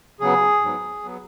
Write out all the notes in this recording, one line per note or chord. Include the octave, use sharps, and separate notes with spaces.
C#3 F#3 B3 G#4
G#2 F#3 B3
F#3 B3